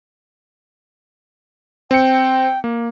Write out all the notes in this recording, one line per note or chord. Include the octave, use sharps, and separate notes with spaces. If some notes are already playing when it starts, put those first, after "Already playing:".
C4 G5 C#7
A#3